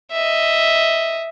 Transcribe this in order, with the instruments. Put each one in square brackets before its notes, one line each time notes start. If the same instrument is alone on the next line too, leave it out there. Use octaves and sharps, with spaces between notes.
[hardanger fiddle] D#5 E5